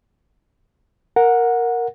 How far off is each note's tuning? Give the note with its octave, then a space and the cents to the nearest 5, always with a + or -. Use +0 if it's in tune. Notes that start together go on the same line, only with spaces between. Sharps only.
A#4 +0 F#5 -15